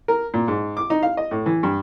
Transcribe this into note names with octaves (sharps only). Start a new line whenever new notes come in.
A#4
A#2
G#2
D6
D#4
F5
D#5
A2
E3
G2